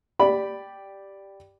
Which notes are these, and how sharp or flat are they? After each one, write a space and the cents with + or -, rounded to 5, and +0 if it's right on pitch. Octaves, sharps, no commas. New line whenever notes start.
G4 +0 D5 +0 B5 +0